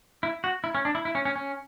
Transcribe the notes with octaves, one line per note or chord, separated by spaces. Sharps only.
E4
F#4
E4
C#4
D4
E4
E4
C#4
C#4
C#4